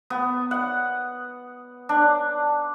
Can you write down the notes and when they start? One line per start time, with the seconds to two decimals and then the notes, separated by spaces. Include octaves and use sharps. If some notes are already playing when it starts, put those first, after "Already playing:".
0.10 B3
0.51 F#5
1.89 D4